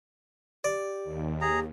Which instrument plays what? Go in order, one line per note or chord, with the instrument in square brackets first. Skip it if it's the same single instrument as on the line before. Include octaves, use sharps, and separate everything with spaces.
[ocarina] G4 [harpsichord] D5
[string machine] D#2
[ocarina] G4 [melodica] G#4 A#5